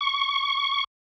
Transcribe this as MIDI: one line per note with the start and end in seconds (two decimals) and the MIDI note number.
0.01 0.84 85